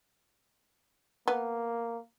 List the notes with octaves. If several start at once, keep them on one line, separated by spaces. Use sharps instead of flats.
A#3 B3